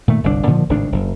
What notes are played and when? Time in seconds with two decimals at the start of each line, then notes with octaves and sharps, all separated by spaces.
0.08 A#2 D#3 A3
0.24 G1 C2 A#2 D4
0.47 A#2 D3 D#3 F3
0.69 G#1 A2 C#3 D4
0.92 F#1 F#2